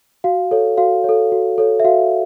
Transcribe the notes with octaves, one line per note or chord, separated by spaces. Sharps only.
F#4 F5
A4 C#5
F#4 F5
A4 C#5
F#4
A4 C#5
E5
F#4 F5